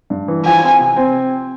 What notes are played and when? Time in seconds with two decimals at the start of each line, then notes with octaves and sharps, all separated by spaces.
0.10 G2
0.28 E3
0.45 F3 G#5
0.63 C4
0.79 C3
0.96 C4